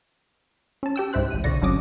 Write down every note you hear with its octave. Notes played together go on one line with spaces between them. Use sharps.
C#4 A5
G4 G5 E6
C#2 G#2 E4 C5 F#6
A1 D#7
C2 B2 D3 D5 C#6 A#6
G1 C3 F#3 C#4 D6 D#6